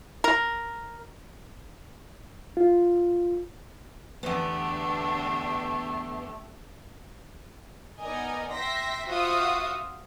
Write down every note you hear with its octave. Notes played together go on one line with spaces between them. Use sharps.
A#4
F4
E2 D3 A3 B3 D4 G4
B3 D#4 A#4 D5 D#5 G#5
E5 G5 C6 A#6 B6
F4 F#4 C5 E5 F5 D#6